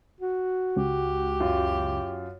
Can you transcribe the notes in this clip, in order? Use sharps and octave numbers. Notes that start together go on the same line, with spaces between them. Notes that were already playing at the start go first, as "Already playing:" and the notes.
F#4
C#2 G4
F#2 F4